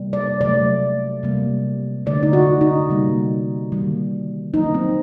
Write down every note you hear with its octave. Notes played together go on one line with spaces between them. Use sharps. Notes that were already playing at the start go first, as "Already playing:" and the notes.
Already playing: C3 G3 A#3
D5
C3 F#3 A3 D5
C3 G3 A#3
D3 A3 D5
D#4
F#4
D#4
C3 G3 A#3
D#3 G3 A#3
D#3 F#3 A#3 D#4
C4